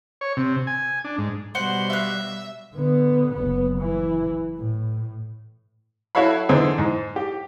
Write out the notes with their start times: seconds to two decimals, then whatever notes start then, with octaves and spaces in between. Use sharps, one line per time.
0.21 C#5
0.37 C3
0.67 G#5
1.04 D4
1.18 G#2
1.55 B2 G3 C5 F#5
1.90 E5 F5 F#6
2.75 D3 B3
3.32 F#1 B3
3.79 E3 E4
4.58 A2
6.15 E4 F#4 A4 C#5 F5 B5
6.49 D3 E3 C4 D#4 G#4 C5
6.78 G#2
7.16 G4